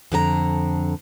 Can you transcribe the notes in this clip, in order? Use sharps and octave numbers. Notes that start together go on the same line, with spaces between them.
F2 D3 G4 A#5